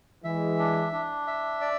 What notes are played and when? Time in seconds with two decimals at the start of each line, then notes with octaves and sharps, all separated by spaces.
0.24 E3 G#3 E5
0.59 D4
0.93 D4
1.27 E5
1.61 D5